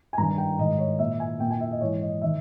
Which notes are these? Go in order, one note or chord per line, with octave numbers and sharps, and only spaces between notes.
G#5
G2 D#3 A#5
G5
G#2 D#3 D#5
C#5
A#2 E5
G#5
A#2 G5
G#5
E5
D#5
G#2 E3 C#5
D#5
D#3 E5